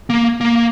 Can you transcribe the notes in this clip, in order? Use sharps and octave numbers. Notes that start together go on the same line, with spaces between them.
A#3
A#3